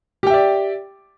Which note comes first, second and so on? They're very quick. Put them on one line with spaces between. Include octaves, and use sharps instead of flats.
G4 G5 E5 D5